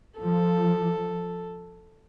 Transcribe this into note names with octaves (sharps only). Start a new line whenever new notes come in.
F3 A4